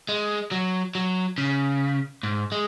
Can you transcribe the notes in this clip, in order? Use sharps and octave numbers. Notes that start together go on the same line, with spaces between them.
G#3
F#3
F#3
C#3
G#2
G#3